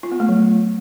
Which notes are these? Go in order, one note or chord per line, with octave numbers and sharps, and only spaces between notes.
F4
B3
A3
F#3
A3